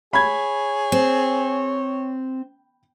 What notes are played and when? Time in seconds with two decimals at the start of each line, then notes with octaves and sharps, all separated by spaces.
0.13 G#4 C#5 B5 G#6
0.92 C4